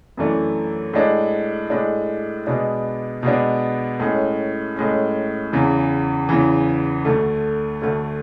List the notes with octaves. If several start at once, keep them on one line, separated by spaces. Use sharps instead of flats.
F#2 E3 A3 D4
A2 G#3 D4
A2 G#3 D4
B2 G#3 B3 D4
B2 G#3 B3 D4
A2 G#3 C#4
A2 G#3 C#4
E2 C#3 E3
E2 C#3 E3
D2 D3 A3
D2 D3 A3